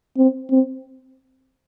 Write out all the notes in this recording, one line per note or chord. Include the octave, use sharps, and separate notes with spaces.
C4
C4